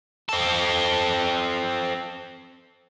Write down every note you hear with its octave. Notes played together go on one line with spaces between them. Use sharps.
C4 A4